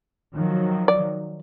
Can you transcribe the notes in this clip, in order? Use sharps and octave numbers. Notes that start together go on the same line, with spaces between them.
D#3 F3 F#3
D5